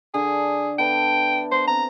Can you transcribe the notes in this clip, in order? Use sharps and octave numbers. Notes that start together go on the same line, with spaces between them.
D3 G#4
B3 A4 E5 G5
B3 C5
C4 A#5